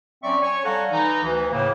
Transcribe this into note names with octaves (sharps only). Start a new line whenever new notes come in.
F#3 C4 C#4 D5 E5 C#6
C#5 G#5 C#6
G3 A4 F5 F#5 G#5 A#5
E3 D#4
D2 E3
A2 C#3 A#3